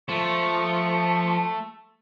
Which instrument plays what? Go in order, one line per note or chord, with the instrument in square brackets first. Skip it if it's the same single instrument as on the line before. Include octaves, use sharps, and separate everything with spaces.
[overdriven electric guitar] F3 [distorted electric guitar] A3 [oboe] C#6